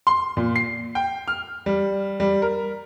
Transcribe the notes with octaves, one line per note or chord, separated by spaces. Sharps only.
C6
A#2
C7
G5
F6
G3
G3
A#4